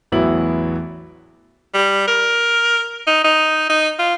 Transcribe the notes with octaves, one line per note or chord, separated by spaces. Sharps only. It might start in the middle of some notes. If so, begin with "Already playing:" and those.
A1 E2 F#3 B3 E4 F#7
G3
A#4
D#4
D#4
D#4
F4